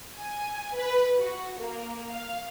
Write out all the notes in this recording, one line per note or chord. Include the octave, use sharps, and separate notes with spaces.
G#5
B4
F#4
A#3
F5